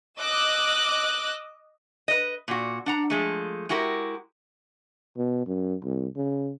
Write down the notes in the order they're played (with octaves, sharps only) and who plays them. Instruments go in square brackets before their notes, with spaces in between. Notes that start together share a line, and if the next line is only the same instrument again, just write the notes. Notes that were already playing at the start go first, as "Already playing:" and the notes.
[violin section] D#5 D6 E6 F#6
[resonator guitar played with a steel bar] B4 D#5
A#2 F#4
D4 F#5 A#5
F3 G#3 A3
G#3 E4 F#4 G4 A#4
[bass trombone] B2
F#2
C2
C#3